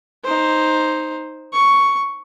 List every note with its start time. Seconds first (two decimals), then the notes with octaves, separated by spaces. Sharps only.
0.24 D#4 C5
1.53 C#6